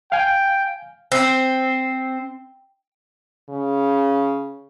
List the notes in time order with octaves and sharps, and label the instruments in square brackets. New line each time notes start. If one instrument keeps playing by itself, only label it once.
[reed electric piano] F5 G#5 [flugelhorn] G5
[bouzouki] C4
[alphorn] C#3